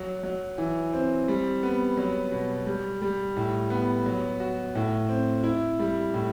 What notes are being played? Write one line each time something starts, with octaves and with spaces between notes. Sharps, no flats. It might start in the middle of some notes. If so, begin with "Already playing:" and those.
Already playing: F#3
F#3
E3
C4
G3
B3
F#3
B2
G3
G3
A2
B3
F#3
F#4
A2
C4
E4
G3
A2